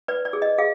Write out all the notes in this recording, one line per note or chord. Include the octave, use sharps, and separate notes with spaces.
B4 D5
D5
G#4
D#5
G#4 F5